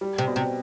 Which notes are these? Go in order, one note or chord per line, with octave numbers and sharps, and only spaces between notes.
G3
C3
B2
C3